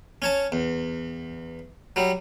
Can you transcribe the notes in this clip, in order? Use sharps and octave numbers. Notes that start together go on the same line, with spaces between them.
C#4 C#5 A5
E2
F#3 G3